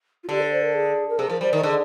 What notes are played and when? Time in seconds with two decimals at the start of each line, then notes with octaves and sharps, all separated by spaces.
0.24 F4
0.29 D3 G4
0.41 D5
0.52 C5
0.62 A#4
0.74 G#4
1.09 A#4
1.19 C3 G#4
1.30 F3 A#4
1.41 G3 C5
1.52 D#3 A#4
1.63 D3 G#4